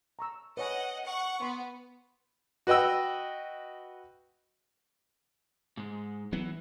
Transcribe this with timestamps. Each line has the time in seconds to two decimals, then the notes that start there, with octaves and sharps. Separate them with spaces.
0.19 A#5 C#6 E6
0.57 B4 C#5 D#5 F#5 G#5
1.05 F#5 C#6
1.42 B3 C6
2.67 F#4 B4 D#5 G5 E6
5.77 G#2 G#3
6.33 E3 F#3 B3